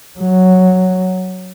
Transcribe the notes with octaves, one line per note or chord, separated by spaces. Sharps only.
F#3